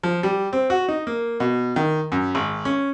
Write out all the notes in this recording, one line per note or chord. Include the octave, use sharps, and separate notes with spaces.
F3
G3
C4
F#4
D#4
A#3
B2
D#3
F#2
G#1
C#4